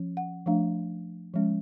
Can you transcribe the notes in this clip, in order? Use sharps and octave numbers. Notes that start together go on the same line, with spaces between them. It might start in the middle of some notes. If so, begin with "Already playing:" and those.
Already playing: F3 C#4
F#5
F3 A3 D4 F5
F3 G#3 C#4